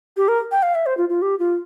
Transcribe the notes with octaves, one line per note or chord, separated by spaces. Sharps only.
G4
A#4
G5
F5
E5
C5
F4
F4
G4
F4